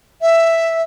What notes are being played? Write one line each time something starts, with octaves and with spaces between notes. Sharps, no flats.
E5